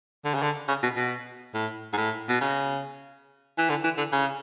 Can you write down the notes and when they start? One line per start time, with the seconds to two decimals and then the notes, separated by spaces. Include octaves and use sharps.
0.25 D3
0.34 C#3
0.42 D3
0.68 C#3
0.83 B2
0.97 B2
1.54 A2
1.93 G#2
1.97 A2
2.29 B2
2.41 C#3
3.58 E3
3.70 D3
3.84 E3
3.98 D3
4.12 C#3